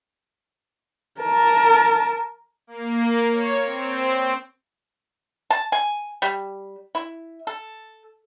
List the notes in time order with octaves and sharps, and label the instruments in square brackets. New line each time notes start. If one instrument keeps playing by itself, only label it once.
[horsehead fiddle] A#4 A5
[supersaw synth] A#3
C#5
C4
[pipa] A5
G#5
G3
E4
A4